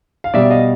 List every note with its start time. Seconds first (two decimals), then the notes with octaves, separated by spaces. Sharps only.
0.24 F5
0.34 B2 G3 D5 E5
0.50 D#5 F5